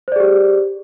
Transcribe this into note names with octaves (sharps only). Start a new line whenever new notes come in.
G4 G#4 C5 D5